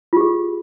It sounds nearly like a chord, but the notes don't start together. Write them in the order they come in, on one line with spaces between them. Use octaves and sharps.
F4 G4 G#4